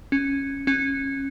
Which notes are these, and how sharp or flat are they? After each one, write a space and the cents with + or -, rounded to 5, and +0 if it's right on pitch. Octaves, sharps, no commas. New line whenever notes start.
C#4 -10
C#4 -20